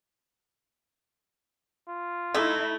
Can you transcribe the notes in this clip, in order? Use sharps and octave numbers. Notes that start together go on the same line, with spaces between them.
F4
A3 D#4 E4 E5